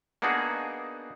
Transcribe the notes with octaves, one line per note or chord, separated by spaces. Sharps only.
A#3 B3 D4 D#4 F#4 G#4